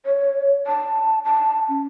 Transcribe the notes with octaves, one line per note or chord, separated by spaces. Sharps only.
C#5
A5
A5
C#4